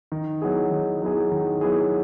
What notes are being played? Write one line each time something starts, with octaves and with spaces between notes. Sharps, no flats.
D#3
F#3 B3 E4 G#4
D#3
F#3 B3 E4 G#4
D#3
F#3 B3 E4 G#4